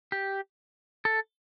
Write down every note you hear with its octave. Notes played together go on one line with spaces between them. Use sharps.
G4
A4